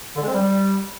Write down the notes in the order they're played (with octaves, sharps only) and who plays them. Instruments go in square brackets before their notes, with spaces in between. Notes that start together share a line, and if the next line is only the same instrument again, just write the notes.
[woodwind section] D3
G#3
C4
G3